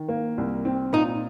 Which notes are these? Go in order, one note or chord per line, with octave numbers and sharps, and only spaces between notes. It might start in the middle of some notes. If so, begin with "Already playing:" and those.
Already playing: D#3
A#3
C2
C4
A#2 D#4